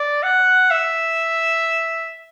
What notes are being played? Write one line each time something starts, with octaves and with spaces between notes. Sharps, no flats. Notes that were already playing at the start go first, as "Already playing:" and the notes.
Already playing: D5
F#5
E5